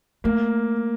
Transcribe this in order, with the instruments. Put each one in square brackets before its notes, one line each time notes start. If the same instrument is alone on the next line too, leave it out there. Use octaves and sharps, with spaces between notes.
[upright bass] A3 [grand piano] A#3